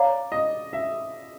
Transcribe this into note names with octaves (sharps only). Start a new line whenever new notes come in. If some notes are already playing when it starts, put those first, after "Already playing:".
Already playing: C#5 D5 F5 A#5
D#5
E5